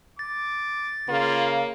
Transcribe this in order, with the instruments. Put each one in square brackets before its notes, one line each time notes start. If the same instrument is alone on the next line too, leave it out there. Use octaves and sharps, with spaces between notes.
[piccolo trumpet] D6 [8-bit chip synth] A6
[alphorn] C#3 [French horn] A#3 [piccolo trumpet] F4